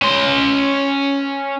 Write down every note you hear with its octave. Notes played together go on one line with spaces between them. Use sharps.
C#4 C6